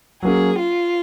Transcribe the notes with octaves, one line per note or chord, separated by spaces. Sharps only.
F#3 A#3 C#4 G#4
F4